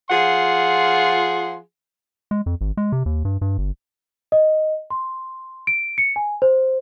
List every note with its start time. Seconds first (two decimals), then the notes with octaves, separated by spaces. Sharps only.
0.11 F3 F4 G#4 F#5 C6
2.31 G#3
2.46 F2
2.61 G#1
2.77 G#3
2.92 C3
3.06 D#2
3.25 G2
3.41 G2
3.58 G1
4.32 D#5
4.90 C6
5.67 D7
5.98 C#7
6.16 G#5
6.42 C5